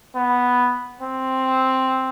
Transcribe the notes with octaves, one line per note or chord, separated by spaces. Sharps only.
B3
C4